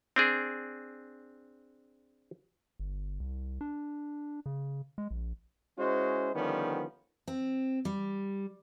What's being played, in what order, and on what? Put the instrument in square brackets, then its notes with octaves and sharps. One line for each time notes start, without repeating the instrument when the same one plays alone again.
[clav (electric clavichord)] C4 D4 G#4
[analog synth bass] G1
C2
D4
C#3
G#3
A#1
[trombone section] G#3 C#4 E4 F#4 C5
D3 D#3 F3 G3 B3 C#4
[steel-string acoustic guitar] C4
G3